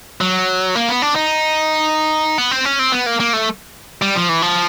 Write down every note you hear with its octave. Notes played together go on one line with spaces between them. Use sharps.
F#3
A#3
B3
D4
D#4
B3
C4
C#4
C4
B3
A#3
A#3
A3
G3
F3
E3
F3